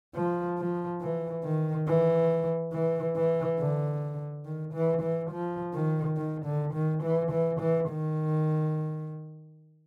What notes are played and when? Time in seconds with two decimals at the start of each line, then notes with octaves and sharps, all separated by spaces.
0.15 F3
0.58 F3
1.01 E3
1.44 D#3
1.87 E3
2.73 E3
3.16 E3
3.59 D3
4.45 D#3
4.73 E3
5.02 E3
5.31 F3
5.74 D#3
6.17 D#3
6.45 D3
6.74 D#3
7.03 E3
7.31 E3
7.60 E3
7.88 D#3